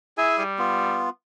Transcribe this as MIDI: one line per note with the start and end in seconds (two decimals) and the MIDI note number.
0.18 0.43 64
0.18 0.43 68
0.18 0.34 76
0.18 0.43 80
0.38 1.04 55
0.59 1.10 59
0.59 1.10 65